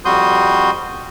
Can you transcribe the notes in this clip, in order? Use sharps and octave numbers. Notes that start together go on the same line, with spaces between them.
F2 G3 F#4 C6 D#6 G6